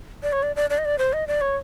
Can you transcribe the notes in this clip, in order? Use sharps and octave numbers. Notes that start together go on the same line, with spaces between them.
D5
C#5
D5
D5
D5
D#5
D5
C5
D#5
D5
C#5